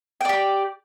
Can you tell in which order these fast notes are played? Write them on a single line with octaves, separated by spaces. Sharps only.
G5 D5 G4